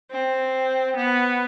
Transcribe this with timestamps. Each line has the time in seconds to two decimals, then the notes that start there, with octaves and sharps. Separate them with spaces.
0.12 C4
0.97 B3